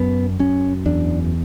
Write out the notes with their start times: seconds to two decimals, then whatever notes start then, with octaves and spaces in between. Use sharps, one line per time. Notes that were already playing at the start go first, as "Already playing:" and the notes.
Already playing: F#2 B3
0.39 F#2 C#4
0.86 E2 D4